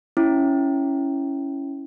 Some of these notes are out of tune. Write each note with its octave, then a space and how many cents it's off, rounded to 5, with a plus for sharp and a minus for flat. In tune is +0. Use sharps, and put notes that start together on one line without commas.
C#4 +0 E4 +0